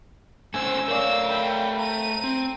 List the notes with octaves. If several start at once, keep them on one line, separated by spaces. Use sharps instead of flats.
A3 C#4 C5 G#5 E6
A3 A#4 C#5 D5 F5 E6
G5 B5
A#5 D#7
C4